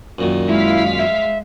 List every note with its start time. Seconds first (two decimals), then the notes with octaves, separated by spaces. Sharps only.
0.18 F#2 A#2 D#3
0.48 G#3 E4 F5 B6
0.99 E5